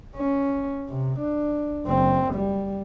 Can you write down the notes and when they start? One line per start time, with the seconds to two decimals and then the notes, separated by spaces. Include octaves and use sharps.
0.16 C#4
0.89 C3
1.19 D4
1.85 F#1 C4
2.34 G3